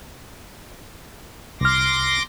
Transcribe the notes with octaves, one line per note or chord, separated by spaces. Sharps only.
C2 C6 D6 F6 A#6